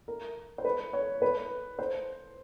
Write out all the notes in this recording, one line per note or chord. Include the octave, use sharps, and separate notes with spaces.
A#4
C5
B4
C#5
B4
C5